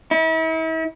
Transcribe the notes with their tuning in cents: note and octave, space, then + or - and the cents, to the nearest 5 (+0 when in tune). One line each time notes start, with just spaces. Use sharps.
E4 -40